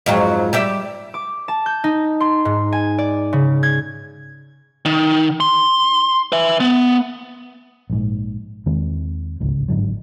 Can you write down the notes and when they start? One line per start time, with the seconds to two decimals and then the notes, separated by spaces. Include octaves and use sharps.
0.06 F2 G#2 F#3
0.53 G3 G4 E5
1.14 D6
1.48 A5
1.66 G6
1.84 D#4
2.20 C6
2.45 G#2
2.72 G#5
2.98 D5
3.33 C#3
3.63 G#6
4.85 D#3
5.40 C6
6.32 B4 E5
6.60 B3
7.90 A#1 G#2
8.66 E2 D#3 G#3 C4
9.40 D1 G#1 C#2 C#3
9.68 G1 G#2 D3 F#3